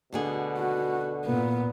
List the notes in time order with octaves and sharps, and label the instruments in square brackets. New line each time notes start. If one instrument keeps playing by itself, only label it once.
[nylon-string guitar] D2 D3 G#4 [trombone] B2
[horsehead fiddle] F#4
[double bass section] A#2 [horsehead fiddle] B3